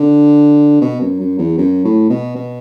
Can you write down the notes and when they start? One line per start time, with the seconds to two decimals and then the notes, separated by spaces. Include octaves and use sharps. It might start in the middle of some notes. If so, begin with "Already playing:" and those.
Already playing: D3
0.81 B2
1.01 F#2
1.20 F#2
1.39 E2
1.58 F#2
1.84 A2
2.10 B2
2.36 B2